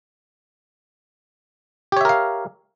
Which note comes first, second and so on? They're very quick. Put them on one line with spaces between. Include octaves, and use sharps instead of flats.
G4 C#5 E5 A#4 F5